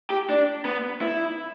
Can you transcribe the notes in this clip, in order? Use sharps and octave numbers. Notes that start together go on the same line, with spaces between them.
G4
D4
B3
E4